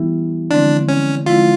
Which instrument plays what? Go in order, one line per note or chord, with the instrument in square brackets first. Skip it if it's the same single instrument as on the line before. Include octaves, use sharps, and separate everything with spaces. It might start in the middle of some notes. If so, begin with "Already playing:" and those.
Already playing: [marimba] E3 G3 B3 E4 G4
[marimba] D3 F3 G#3 C4 E4 [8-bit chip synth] D4
[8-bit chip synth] C#4
[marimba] D3 F3 G#3 C4 E4 [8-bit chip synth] F4